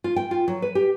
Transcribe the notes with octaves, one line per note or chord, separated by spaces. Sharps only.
F4
G5
F4
F#3
B4
G4